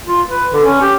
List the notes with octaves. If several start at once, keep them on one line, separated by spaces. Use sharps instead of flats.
F4
B4
D3
C#4
G4